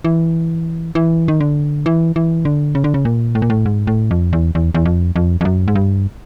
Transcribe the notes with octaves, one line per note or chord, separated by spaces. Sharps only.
E3
E3
D#3
D3
E3
E3
D3
C#3
D3
C#3
A#2
A2
A#2
A2
G#2
A2
F2
E2
E2
E2
F2
F2
F2
F#2
G#2
G2